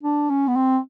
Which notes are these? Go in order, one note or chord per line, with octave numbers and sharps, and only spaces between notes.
D4
C#4
B3
C4